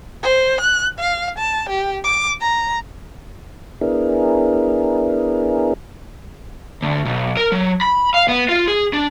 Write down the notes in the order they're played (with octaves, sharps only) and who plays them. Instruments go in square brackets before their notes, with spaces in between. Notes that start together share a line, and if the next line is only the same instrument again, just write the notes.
[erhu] C5
F#6
F5
A5
G4
D6
A#5
[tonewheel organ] B3 D4 E4 G#4 A#4
[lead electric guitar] D2
B1
A#4
F#3
B5
F5
B3
F4
G#4
D4